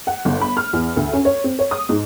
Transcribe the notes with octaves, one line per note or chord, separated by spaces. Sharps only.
F#5
G1
B5
F6
E2
D2
C#4
C#5
C4
C#5
D#6
G#2